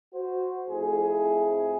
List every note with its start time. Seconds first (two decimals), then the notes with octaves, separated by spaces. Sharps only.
0.14 F#4 C5
0.69 F2 A3 E4 G#4